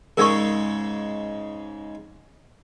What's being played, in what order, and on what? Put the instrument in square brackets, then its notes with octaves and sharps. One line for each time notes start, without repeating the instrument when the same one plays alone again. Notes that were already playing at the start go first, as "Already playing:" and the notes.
[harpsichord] G#2 C#3 G#3 [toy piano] A#4 D5 C#6